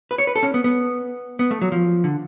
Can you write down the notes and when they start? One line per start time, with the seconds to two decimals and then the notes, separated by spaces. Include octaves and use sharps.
0.11 B4
0.18 C#5
0.27 B4
0.36 A4
0.43 C#4
0.54 B3
0.64 B3
1.39 B3
1.51 A3
1.61 F#3
1.72 F3
2.04 D3